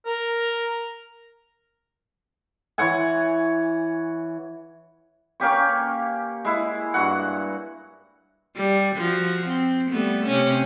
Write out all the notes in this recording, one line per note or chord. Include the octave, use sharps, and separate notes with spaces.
A#4
E3 C#5 F#5 G#5
A#3 C#4 G4 C#6
G#3 E4
G2 F#4 F#5
G3
F3 F#4
C4
G3 A3 B3
C3 C#4